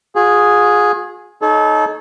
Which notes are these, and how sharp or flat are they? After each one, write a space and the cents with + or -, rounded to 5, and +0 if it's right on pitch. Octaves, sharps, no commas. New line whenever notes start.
F4 +45 G#4 +0
D#4 +0 A4 -35 C#5 +0